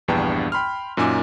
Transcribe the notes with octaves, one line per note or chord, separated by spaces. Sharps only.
A#1 E2 G2 B3 G5 A5
G5 B5 C6 F6
F#2 A#2 D#4 G#5 D6 E6